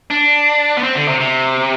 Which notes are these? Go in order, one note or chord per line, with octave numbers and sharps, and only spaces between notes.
D4
B3
C4
D3
C3
C3